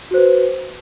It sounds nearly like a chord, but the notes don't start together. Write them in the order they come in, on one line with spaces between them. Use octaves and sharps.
F#4 C5 B4